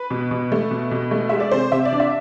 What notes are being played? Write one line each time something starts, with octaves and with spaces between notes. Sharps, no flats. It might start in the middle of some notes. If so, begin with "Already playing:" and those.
Already playing: B4
B2
B2
A3
B2
B2
A3
G#3 E5
D5
C3 C5
C3 E5
D5
D4
E5